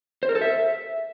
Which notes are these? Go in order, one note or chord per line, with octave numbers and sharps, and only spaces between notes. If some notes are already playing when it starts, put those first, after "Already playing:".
C5
A#4
A4
E5